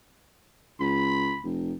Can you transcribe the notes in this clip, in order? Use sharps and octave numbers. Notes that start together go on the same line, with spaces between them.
C#2 B5
F1